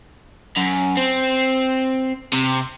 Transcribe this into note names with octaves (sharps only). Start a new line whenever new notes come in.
F#2
C4
C3